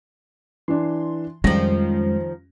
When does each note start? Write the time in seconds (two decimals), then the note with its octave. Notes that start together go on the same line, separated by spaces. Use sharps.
0.68 E3 D4 C6
1.44 F2 D#3 F3 G3 G#3 C#4 A#6